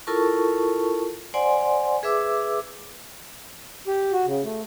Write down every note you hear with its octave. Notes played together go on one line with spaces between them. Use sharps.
E4 F4 A4 A#4 A5 C#6
C5 D5 F#5 G#5 C6
G#4 B4 E5 D6 E6
G4
F#4
C#3
A3